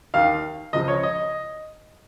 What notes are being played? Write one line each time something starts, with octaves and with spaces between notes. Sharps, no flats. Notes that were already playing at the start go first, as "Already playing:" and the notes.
D#2 D#3 F5
C#2 C#3 F3 D#5
C#5
D#5